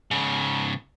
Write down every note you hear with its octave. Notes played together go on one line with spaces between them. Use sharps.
G#2 C#3